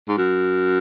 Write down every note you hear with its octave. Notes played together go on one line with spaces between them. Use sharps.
G#2
F#2